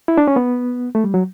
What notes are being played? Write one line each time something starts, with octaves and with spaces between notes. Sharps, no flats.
E4
D4
C#4
B3
A3
G3
F#3